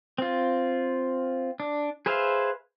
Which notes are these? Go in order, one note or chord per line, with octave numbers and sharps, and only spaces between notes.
C4 F4
D4
G#4 B4 C5 E5 F5